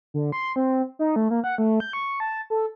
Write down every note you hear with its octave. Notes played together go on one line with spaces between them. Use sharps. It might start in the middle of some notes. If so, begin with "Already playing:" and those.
D3
C6
C4
D#4
A3
A#3
F#5
A3
G6
C#6
A5
A4